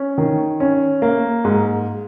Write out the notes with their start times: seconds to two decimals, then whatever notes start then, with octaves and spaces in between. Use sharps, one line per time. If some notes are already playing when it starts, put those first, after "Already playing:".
Already playing: C#4
0.18 D#3
0.60 C#4
1.02 A#3
1.45 G#2